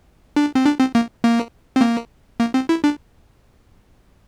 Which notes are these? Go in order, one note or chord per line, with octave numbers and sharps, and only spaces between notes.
D4
C4
D4
C4
A#3
A#3
C4
A#3
A#3
C4
E4
D4